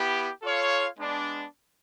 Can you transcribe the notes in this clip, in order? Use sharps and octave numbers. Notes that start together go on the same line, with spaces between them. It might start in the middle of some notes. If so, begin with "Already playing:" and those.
Already playing: B3 E4 G4
F4 A4 C#5 F5
G#3 B3 D4